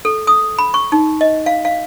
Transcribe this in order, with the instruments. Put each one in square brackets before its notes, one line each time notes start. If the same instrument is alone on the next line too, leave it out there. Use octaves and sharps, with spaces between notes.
[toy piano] A4
D#6
B5
C#6
D#4
D#5
F5
F5